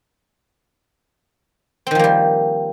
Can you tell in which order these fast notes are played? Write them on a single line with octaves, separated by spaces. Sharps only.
C4 D#3 F3 A#3 G3